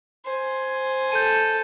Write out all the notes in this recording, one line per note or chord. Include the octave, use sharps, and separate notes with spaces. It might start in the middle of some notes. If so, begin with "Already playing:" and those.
C5 G#5
A4 G6 D#7